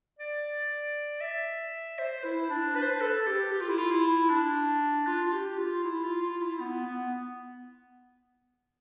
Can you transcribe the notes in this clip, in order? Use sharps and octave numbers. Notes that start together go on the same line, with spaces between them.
D5
E5
C5
E4
D4
B4
C5
B4
A4
G4
G4
F4
E4
F4
E4
D4
F4
F4
G4
F4
E4
F4
F4
E4
B3
B3